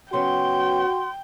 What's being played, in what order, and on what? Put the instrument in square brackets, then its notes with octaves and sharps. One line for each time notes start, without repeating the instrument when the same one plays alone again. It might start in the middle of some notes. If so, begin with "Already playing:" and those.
[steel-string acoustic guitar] C#3 F#3 B3 [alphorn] F#4 [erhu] G5 [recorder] C6